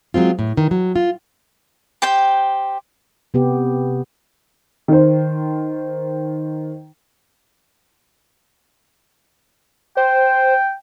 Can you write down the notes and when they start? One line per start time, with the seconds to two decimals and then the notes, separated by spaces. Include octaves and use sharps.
0.14 F#3 G#3 C4 F4
0.39 A2
0.57 D#3
0.71 F#3
0.96 F4
2.02 G4 C5 G5
3.34 C3 B3 G4
4.88 D#3 C5
9.97 C5 G5